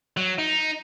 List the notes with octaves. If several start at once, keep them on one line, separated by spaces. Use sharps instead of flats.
F#3
D#4